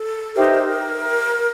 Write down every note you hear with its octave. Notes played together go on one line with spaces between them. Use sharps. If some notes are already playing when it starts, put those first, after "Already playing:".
Already playing: A4
D#4 G4 A#4 C5 E5
B4
A#4